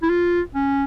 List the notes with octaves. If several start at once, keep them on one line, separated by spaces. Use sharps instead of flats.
E4
F4
C#4